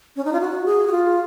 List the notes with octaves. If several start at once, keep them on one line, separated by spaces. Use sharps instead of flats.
C#4
D#4
F4
F#4
G#4
F#4
F4